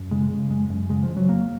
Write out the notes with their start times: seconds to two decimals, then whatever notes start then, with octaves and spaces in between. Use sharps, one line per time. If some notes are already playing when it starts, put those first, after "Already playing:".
Already playing: F#2
0.11 C#3 G#3
0.31 C#3
0.50 F#2 G#3
0.70 F#2
0.89 C#3 G#3
1.03 F3
1.09 C#3
1.16 F#3
1.29 F2 A#3